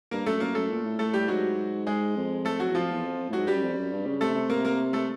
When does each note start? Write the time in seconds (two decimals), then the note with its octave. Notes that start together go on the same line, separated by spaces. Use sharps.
0.11 G2 A#3 A#4
0.26 F#2 A3 A4
0.40 F#2 A#3 A#4
0.55 F#2 A3 A4
0.70 A#2
0.85 A2
0.99 A3 A4
1.13 G3 G4
1.28 G#2 F#3 F#4
1.87 G#3 G#4
2.17 F2
2.45 A3 A4
2.60 F#3 F#4
2.68 E2
2.74 F2 F3 F4
2.89 E2
3.04 F2
3.29 A2
3.33 G#2 F#3 F#4
3.46 G2 G3 G4
3.54 F#2
3.62 F2
3.76 F#2
3.91 G2
4.06 C#3
4.21 C3 A3 A4
4.35 C3
4.50 A#3 A#4
4.65 A#3 A#4
4.93 A3 A4